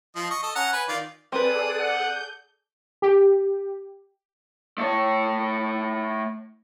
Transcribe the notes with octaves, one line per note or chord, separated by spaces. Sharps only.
F3 D#5
D#5 C#6
A4 D#5
C#4 F#5 A#5
B4 G#5
D#3 F4 D5
C4 G#4 A4 B4 D5 D#6 F#6
F#5 G6
G4
A3 C#5